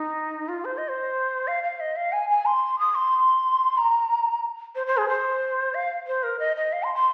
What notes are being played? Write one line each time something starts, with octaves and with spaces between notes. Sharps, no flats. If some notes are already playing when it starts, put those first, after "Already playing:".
Already playing: D#4
F4
C5
D#5
C5
F5
F5
D#5
F5
G#5
G#5
C6
D#6
C6
A#5
C5
C5
G#4
C5
F5
C5
A#4
D#5
D#5
F5
C6
C6